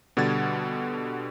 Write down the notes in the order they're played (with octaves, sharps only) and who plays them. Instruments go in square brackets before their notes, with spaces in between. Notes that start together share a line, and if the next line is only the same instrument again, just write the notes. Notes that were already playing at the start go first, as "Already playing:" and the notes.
[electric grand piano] B2 D3 G3 F#5 G#6 A6